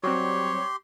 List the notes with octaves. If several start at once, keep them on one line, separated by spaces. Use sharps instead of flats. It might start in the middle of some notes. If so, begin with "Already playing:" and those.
F#3 G3 C4 G4 C#5 C6